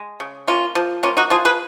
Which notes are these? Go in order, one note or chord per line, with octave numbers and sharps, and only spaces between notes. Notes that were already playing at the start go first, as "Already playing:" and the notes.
Already playing: G#3
C#3
A#3 C#4 F4
F3
A#3 C#4 F4
D#4 F#4
F3 F4 G#4
G#4 B4